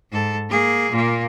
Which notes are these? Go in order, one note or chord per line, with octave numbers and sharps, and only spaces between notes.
G#2 A4
A#3 G#4
A#2 A#3